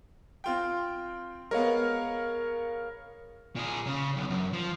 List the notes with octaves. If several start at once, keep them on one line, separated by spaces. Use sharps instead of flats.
C4 F4 G5
G#3 B3 A#4 C#5 F5
A#2 G#4
C#3
B1
F#2
F3